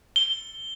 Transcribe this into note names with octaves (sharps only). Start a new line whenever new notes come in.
G7